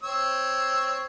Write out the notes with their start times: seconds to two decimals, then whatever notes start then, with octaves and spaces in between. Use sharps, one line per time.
0.03 C4 C#5 E6